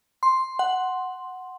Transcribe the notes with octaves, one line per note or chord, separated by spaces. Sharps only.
C6
F#5